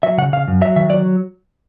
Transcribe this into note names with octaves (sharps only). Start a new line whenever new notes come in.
F#3 E5
C#3 F#5
C#3 F5
F#2
F#3 E5
D#3 E5
F#3 D5